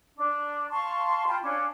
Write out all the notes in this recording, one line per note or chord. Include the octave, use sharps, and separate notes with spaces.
D4
F5 A5 C6 C#6
F4 G5 A5 B5
C#4 D4 F5